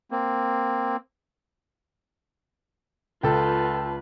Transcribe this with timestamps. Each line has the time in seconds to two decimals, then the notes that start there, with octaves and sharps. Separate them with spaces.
0.11 A#3 C4
3.23 C#2 F4 A4 B4 G5 A5